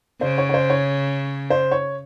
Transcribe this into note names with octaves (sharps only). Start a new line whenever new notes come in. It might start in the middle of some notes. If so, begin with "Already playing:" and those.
C#3 C5
C#5
C#5
C5
C#5
C5
C#5